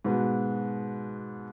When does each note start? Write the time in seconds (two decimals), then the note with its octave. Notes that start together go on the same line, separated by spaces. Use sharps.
0.04 G#2 B2 B3